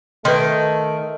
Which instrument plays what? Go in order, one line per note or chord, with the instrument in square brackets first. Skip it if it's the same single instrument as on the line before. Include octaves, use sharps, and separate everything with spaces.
[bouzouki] D#3 [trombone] A3 [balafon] B4 C6